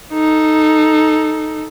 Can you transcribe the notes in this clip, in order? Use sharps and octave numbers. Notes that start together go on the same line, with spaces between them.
D#4 A4